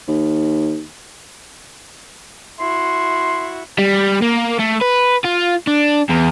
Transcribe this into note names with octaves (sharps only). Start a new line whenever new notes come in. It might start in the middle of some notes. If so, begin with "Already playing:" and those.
D#2
E4 F#4 C6
G3
A#3
A3
B4
F4
D4
E2